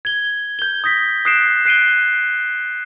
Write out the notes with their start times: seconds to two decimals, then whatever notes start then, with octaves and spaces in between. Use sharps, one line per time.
0.05 G#6 G7
0.59 G6 G7
0.84 D#6 G6 A#6 B6
1.25 D#6 F#6 C7 D7 E7
1.65 F#6 C7 D7 D#7 G7